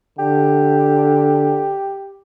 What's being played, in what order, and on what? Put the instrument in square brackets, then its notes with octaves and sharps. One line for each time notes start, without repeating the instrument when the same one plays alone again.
[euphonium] D3 [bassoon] G4